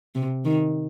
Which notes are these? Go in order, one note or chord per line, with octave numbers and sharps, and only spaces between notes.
C3
D#3